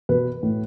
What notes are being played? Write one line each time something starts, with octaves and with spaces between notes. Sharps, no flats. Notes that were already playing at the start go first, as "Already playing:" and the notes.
B2 B4
A2